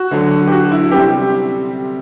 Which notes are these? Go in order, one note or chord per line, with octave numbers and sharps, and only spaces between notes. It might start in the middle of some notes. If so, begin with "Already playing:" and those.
Already playing: F#4
D2 D3 F#3
G4
F#4
E4
C3 G3 C4 G4